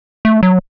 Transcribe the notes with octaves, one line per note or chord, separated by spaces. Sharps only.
A3
F#3